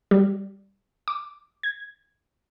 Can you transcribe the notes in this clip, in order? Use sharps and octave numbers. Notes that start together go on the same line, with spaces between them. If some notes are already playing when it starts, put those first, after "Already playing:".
G3
D6
G#6